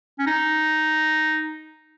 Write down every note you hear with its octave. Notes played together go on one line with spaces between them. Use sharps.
C#4
D#4